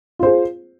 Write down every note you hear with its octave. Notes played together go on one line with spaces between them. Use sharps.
F4 G#4 C5